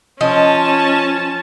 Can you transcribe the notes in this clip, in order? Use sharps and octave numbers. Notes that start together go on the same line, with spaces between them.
F3 C#4 D#5 A5